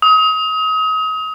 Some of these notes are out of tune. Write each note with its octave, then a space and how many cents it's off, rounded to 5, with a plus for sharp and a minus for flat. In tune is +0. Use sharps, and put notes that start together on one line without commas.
D#6 +30